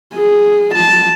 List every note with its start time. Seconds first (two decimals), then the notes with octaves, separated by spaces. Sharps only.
0.14 G#4
0.74 A5